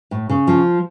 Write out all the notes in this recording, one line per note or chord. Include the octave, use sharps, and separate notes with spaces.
A2
C#3
F3